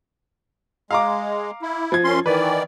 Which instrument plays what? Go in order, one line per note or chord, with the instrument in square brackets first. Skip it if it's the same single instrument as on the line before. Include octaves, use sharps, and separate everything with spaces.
[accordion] G#3 [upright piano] F5 A#5 D6
[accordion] E4
[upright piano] F3 G#6
[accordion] F#2 C#4 C6
[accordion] D#3 E3 D5 [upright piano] B4